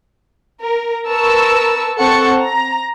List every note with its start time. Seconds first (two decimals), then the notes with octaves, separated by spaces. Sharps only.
0.62 A#4
1.08 A#4 B4 A5 C#6 E6
1.99 C4 A4 F#5 A5 C#6 C#7
2.45 A#5